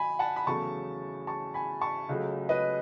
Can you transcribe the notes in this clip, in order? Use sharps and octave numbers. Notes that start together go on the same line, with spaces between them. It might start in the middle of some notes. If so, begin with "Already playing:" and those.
Already playing: D#3 F#3 G#5 B5
F#5 A5
B5
E2 C#3 F#3 A3 A5 C#6
A5 C#6
G#5 B5
A5 C#6
C#2 C#3 F#3 A3
B4 D#5